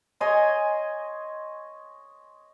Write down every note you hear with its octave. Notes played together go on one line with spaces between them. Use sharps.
C#5 D#5 G#5 C6